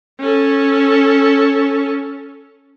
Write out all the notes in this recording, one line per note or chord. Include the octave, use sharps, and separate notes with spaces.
C#4 A4